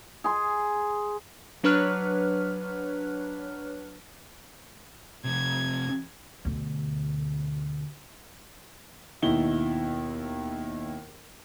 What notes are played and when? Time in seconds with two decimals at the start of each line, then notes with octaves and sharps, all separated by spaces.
0.24 G#4 C6
1.64 F#3 D4 B4 C#5 F6 F#6
5.25 F2 C3 G#6
6.45 D2 B2
9.22 D#2 B2 D#4 E4 G7